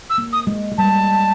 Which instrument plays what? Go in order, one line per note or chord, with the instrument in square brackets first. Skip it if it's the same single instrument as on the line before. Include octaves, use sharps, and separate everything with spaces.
[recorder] E6
[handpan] A#3
[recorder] D#6
[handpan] G#3
G#3
[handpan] G3 [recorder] A5